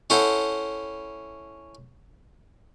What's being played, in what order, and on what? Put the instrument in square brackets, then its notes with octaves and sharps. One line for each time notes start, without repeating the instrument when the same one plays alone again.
[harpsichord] C#4 E4 A4 C5 F#5